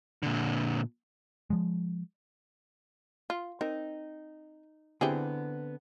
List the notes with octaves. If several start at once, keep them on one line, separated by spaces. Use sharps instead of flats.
A#2 D3
F3 G#3
F4
C4 D#4 A#4
D3 B3 C4 E4 G4 G#4